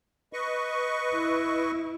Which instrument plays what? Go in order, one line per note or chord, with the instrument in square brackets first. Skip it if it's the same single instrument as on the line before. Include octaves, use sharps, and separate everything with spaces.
[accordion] B4 D#5 C#6
[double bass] E4